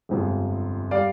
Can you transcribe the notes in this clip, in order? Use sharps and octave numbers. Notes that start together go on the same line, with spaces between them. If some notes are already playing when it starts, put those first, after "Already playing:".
G1 F2 C3 F3 G#3
G3 D5 F5